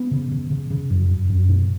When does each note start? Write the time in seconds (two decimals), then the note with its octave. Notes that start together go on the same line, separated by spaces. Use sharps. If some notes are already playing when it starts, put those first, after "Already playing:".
Already playing: B3
0.11 C#3
0.31 C#3
0.50 C#3
0.70 C#3
0.90 F#2
1.09 F#2
1.30 F#2
1.49 B2